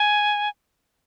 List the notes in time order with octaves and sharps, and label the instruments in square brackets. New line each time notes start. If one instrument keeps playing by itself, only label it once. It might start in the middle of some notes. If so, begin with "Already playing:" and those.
Already playing: [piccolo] G#5